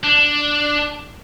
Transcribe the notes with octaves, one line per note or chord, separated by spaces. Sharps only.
D4